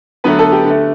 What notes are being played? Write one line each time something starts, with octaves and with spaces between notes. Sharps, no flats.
D3 F#3 A3 B3 B4
A4
G4
D3
A3